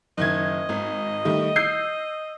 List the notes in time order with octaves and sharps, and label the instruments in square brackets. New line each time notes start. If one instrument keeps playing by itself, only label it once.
[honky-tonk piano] F#1 D#3 G#6 [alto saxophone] D#5
[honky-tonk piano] G#1
D#3 G3 A3
E6 G6 C7